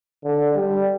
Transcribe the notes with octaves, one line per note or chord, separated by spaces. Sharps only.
D3
G3